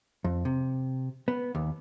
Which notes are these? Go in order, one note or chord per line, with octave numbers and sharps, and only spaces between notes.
F2
C3
B3
D#2